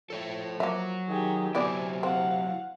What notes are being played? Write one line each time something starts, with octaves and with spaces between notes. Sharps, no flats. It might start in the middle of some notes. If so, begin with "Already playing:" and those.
F3 A4 C#5 E5
F#3 A#3 E5
D#3 G4 G#4
C3 F#3 B3 E4 G4 D5 G#5
C4 F5 F#5